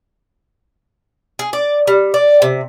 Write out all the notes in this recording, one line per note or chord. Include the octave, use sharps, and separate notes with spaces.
G#4
D5
G3
D5
C3